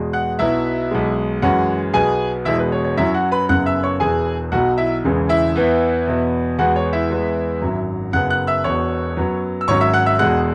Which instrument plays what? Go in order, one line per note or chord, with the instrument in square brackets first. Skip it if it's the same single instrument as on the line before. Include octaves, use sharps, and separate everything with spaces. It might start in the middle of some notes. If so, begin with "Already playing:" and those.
Already playing: [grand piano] E2 B2 G#3
F#5 F#6
B1 B2 F#3 B3 E4 E5
B1 B2 G#3
F#2 E3 G#3 C#4 F#4 F#5
B1 B2 B3 G#4 G#5
E1 E2 B2 G#3 E4 E5
B4
C#5
C#5
F#2 F#3 C#4 E4 E5
F#4 F#5
B4 B5
F#1 F#2 C#3 F#3 B3 F#5 F#6
E5 E6
C#5 C#6
E1 E2 E3 G#4 G#5
B1 B2 F#3 F#4 F#5
E4 E5
E1 E2 C#3 E3 G#3
E4 E5
E2 E3 B3
E2 B2 B3
E2 E3 G#3 B3 F#4 F#5
C#5
E4 E5
E2 E3 G#3 B3
G#1 F#2 F#3
F#1 F#2 C#3 F#3 B3 F#5 F#6
F#5 F#6
E5 E6
E1 E2 B2 B3 C#5 C#6
F#2 F#3 B3
E6
G#1 G#2 F#3 C#4 C#5 C#6
E5 E6
F#5 F#6
E5 E6
E1 E2 B2 G#3 F#5 F#6